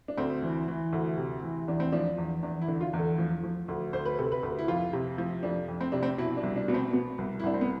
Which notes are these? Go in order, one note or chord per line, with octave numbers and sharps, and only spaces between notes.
D4
D2 C4
E3
E3
D2
C3
E3
E2 D4
C4
F3 D4
E2
E2 D4
E4
D3
F4
E2
A4
F3
F3
D2
D2 C5
B4
C3 A4
B4
D2
E4
F2 F4
C3
F3
F2 D4
F2
C4
C3 D4
C4
B2 E4
D4
C2
D4
B2 B3
C4
B2 B3
C2
E4
C2 D4
C4
B3